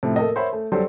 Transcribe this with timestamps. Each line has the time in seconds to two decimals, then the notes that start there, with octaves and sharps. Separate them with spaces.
0.03 A2 C3 F3
0.16 A#3 A4 A#4 D#5
0.35 A#4 C5 C#5 E5 F#5 B5
0.53 A3
0.72 F#3 G3 G4 A4 C5